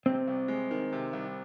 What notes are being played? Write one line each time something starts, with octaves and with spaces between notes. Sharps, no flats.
C3 C4
C2
G#3
D#3
C3
C2